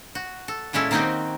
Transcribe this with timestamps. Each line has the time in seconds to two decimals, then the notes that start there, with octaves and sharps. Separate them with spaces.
0.15 F#4
0.48 A4
0.73 A#2 G#3 C#4 E4 A4
0.91 D#3 A#3 C4 D#4 F#4 G4